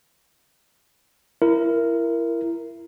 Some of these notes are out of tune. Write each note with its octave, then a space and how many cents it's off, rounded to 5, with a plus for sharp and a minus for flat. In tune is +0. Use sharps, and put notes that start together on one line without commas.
E4 +25 A#4 +0